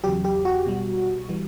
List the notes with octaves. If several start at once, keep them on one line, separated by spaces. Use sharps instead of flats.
E2 C#3 F#3 G4
G4
F#4
B2 G3
E3 G3